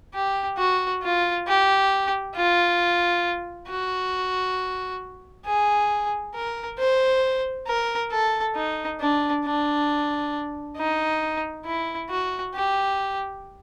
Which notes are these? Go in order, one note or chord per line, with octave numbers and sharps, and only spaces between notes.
G4
F#4
F4
G4
F4
F#4
G#4
A#4
C5
A#4
A4
D#4
D4
D4
D#4
E4
F#4
G4